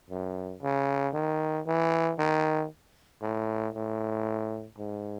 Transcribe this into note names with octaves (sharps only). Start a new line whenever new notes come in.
F#2
C#3
D#3
E3
D#3
A2
A2
G#2